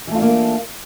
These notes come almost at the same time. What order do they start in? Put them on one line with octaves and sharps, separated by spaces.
E3 A3 F4 D4 A#3